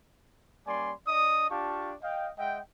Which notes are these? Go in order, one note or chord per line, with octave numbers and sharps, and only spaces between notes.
G3 A#3 C#4 D5 G#5 C6
D4 D5 D#5 D#6
D4 F4 G4 F5 A5 C#6
D#5 F5 G5
G#3 D#5 E5 F#5 G5